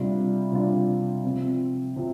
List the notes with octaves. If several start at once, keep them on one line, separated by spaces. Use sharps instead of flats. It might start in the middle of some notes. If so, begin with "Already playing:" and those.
Already playing: C3 G3 D4 F4
C3 G3 D4 F4
C3 F3 C4
C3 F3 C4